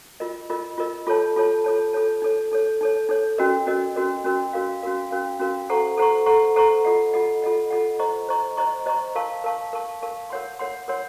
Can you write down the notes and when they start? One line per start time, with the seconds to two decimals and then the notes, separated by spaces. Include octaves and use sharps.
0.20 F4 A#4 D#5
0.50 F4 A#4 D#5
0.78 F4 A#4 D#5
1.07 F4 A4 C#5 A5
1.36 F4 A4 C#5 A5
1.64 F4 A4 C#5 A5
1.93 F4 A4 C#5 A5
2.22 D#4 A4 C#5
2.51 D#4 A4 C#5
2.81 D#4 A4 C#5
3.09 D#4 A4 C#5
3.38 C#4 F#4 A#4 D#5
3.67 C#4 F#4 A#4 D#5
3.96 C#4 F#4 A#4 D#5
4.24 C#4 F#4 A#4 D#5
4.53 C#4 F#4 A#4 F5
4.82 C#4 F#4 A#4 F5
5.11 C#4 F#4 A#4 F5
5.39 C#4 F#4 A#4 F5
5.69 A4 C5 F#5 A#5 C#6
5.97 A4 C5 F#5 A#5 C#6
6.26 A4 C5 F#5 A#5 C#6
6.56 A4 C5 F#5 A#5 C#6
6.85 F4 A4 D#5 F#5
7.14 F4 A4 D#5 F#5
7.42 F4 A4 D#5 F#5
7.70 F4 A4 D#5 F#5
8.00 C5 D#5 A#5 C#6
8.29 C5 D#5 A#5 C#6
8.57 C5 D#5 A#5 C#6
8.86 C5 D#5 A#5 C#6
9.15 A#4 F5 A5 C#6
9.44 A#4 F5 A5 C#6
9.73 A#4 F5 A5 C#6
10.02 A#4 F5 A5 C#6
10.30 A#4 C#5 F#5 C6
10.59 A#4 C#5 F#5 C6
10.88 A#4 C#5 F#5 C6